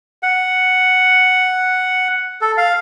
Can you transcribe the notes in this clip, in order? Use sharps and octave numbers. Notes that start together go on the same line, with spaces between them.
F#5
A4
F5